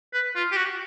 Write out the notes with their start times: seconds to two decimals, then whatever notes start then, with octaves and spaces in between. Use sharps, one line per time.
0.13 B4
0.36 F4
0.52 G4
0.57 F#4